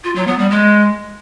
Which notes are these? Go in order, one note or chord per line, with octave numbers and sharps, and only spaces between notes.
F4
F#3
B3
G3
G#3